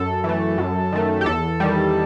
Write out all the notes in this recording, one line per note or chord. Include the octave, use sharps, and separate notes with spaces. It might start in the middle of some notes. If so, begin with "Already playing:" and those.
Already playing: F#2 A4
E3 A3
F#2
D#3 A3
G4
E2 A4
D#3 G3